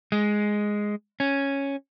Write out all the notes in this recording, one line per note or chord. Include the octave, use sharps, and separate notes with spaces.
G#3
C#4